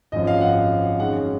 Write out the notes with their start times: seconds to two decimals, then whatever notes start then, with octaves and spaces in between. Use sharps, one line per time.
0.12 G#1 F#2 F3 D#5
0.27 F5
0.41 F#5
0.99 F#2 D#3 G#3 F#5